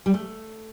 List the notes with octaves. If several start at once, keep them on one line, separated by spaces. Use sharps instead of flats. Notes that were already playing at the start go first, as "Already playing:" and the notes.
G3
A3